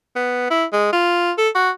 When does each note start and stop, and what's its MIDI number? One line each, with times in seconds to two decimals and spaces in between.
0.16 0.48 59
0.51 0.65 64
0.73 0.89 56
0.93 1.32 65
1.38 1.49 69
1.55 1.70 66